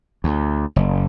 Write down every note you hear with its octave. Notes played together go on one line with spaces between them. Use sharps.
D2
F#1